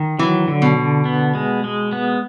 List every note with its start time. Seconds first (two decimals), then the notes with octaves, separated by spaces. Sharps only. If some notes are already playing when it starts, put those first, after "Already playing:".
Already playing: D#3
0.19 E3 F#3
0.48 D3
0.62 B2
0.77 D3
1.05 B3
1.35 G#3
1.64 G#3
1.93 B3